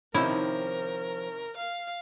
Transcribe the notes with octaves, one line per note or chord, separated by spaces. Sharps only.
C3 D#3 F3 C#4 D#4 E4 A#4
F5